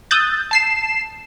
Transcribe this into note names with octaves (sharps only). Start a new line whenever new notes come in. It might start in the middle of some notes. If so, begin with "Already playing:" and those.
D#6 E6 F#6 G6 A6
A5 C7 E7